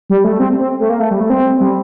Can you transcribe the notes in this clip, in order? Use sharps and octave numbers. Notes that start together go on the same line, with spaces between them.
G3
A3
C4
C4
A3
A#3
A3
G3
A3
C4
G3